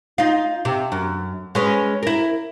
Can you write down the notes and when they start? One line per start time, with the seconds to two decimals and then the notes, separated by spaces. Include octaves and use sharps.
0.18 D#4 F4
0.65 C3
0.92 F#2
1.55 G#3 C#4 B4
2.03 E4 A#4